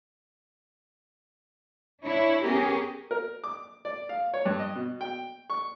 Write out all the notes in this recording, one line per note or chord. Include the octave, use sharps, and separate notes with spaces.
D4 E4 C#5
B3 C#4 G4 G#4 A#4
A#4
D6
D5
F5
C#5
G2
D#5
B2
G5
C#6